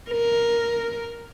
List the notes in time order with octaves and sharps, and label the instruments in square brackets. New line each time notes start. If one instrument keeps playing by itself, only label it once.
[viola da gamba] A#4